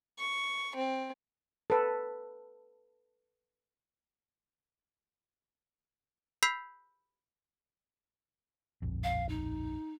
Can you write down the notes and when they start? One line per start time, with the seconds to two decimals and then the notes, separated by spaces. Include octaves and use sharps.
0.18 C#6
0.75 C4
1.70 A4 B4
6.43 B5 E6 G6 B6 C7 F7
8.82 D1 A#1 F2
9.04 F5
9.29 D#4